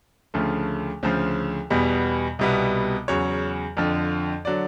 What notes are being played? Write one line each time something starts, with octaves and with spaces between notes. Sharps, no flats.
D2 C#3 F3 A3
D2 C#3 F3 C5
E2 B2 G3 B3
C2 B2 G3 B3
E2 C#3 F#3 C#5
F2 D3 F3
D3 F#3 D5